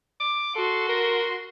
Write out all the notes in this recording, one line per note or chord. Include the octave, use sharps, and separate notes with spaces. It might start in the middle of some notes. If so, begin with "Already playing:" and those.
D6
F#4 A4 C6
A#4